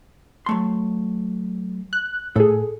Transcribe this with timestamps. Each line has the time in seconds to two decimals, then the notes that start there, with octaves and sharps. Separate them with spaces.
0.46 F#3 A3 C6
1.93 F#6
2.36 A2 G#4 A4